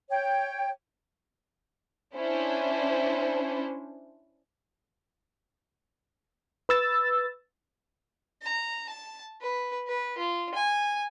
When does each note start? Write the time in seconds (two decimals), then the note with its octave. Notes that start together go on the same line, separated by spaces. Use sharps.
0.10 C#5 G5
2.16 C#4 D4 E4 C5
6.69 B4 E6 A6
8.42 A#5
8.89 A5
9.42 B4
9.87 B4
10.18 F4
10.54 G#5